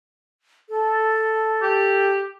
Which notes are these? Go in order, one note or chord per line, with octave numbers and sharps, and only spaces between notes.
A4
G4